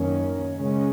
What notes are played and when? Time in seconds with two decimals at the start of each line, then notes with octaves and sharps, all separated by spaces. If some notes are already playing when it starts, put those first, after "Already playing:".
Already playing: F#2 D#3 A#3 C#4
0.55 C#3 G#3 C#4